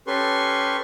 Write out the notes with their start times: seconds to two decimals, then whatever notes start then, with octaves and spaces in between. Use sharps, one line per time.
0.07 C#4 G4 A4 B4 C6 C#6